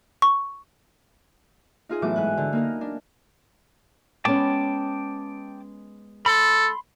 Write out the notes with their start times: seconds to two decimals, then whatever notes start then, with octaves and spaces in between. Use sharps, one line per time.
0.22 C#6
1.89 D#4 F4 G#4
2.02 A2 E3 F#3 B3 D6
2.16 G#2 G#5 F#6
2.37 D3
2.53 A#3 D#4 A#4
2.81 D4
4.25 G#3 B3 C#4 G5 A5 D6
6.26 A4 B5 C6